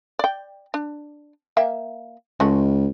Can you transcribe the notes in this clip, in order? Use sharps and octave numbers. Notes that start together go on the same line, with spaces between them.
D5 G5
D4
A#3 E5 G5
C#2 G#3 A3 F#4